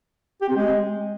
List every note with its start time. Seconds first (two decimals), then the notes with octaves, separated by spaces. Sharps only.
0.41 G4
0.49 C4
0.56 G#3